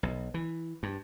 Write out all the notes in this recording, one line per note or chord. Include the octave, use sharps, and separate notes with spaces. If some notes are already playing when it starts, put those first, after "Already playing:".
B1
E3
G2